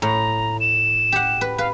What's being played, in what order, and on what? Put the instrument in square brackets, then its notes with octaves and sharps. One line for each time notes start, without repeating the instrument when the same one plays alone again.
[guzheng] A2 [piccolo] A#5
[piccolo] E7
[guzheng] G4 F#5
B4
[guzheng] B4 [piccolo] F5